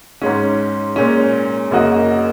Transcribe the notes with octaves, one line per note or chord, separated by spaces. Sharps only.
G#2 G#3 C#4
A#2 G#3 C#4
F#2 C#3 A#3 F#4 D#5